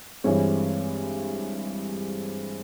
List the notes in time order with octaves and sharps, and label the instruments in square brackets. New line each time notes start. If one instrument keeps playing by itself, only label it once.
[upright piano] G2 E3 G#3 C4 C#5